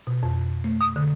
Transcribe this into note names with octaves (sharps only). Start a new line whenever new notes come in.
B2
F2
A3
D#6
D3